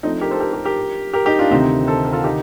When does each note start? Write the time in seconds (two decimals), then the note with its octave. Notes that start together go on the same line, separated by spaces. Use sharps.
0.03 F3 A3 C4 D4 D#4
0.21 G4 A#4
0.31 A4 C5
0.40 G4 A#4
0.53 G4 A#4
0.64 G4 A#4
1.13 G4 A#4
1.26 D#4 G4
1.39 D4 F4
1.50 D2 C3 D#3 C4 D#4
1.87 A4 C5
2.04 A#4
2.13 F4 A4
2.24 D#4 G4